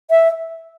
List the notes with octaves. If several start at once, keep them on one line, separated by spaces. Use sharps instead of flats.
E5